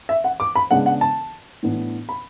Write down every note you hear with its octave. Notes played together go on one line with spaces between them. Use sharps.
E5
F#5
D6
B5
C#3 G#3 B3 D4 F#5
F#5
A5
A2 E3 B3 D4
B5